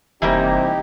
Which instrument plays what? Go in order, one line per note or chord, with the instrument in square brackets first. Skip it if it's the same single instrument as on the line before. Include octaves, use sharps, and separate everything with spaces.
[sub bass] F1 [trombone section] C3 [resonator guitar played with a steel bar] E3 G3 A#3 [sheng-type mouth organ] D#4 G4